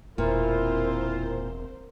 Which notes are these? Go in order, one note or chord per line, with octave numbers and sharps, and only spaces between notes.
E1 A#2 C4 E4 F4 A#4 C5